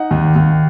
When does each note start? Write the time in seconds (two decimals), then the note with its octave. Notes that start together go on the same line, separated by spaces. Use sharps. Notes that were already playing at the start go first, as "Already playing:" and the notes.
Already playing: D#4 F#5
0.11 D#2
0.36 D#2